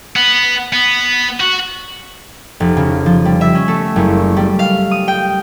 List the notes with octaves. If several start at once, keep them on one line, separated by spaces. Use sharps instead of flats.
B3
B3
F#4
F1
C#3
F3
G3
E5
C#4
A3
F#1
G3
F5
D#6
G5